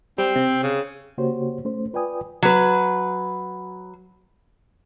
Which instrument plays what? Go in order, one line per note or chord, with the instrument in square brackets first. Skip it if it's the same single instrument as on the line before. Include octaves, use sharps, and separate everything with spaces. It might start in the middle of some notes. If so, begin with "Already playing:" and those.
[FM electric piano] G3 [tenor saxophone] C4
[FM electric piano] C3
[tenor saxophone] C#3
[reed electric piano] C#3 A#3 F#4 G4 C5 C#5
A3 C#4 C5
F4 B4 D5 G5 G#5 D#6
[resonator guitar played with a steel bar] F#3 B4